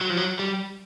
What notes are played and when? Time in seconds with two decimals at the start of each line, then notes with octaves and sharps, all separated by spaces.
0.01 F#3
0.10 F3
0.17 F#3
0.39 G3